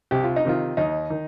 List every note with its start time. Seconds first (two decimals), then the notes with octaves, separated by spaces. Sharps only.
0.11 C2 G4
0.24 F4
0.36 D#4
0.45 C3 D#3 F4
0.77 D#2 D#4
1.10 D#3